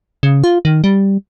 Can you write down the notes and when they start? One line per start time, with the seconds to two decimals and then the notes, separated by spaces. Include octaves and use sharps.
0.23 C#3
0.44 F4
0.65 D#3
0.84 G3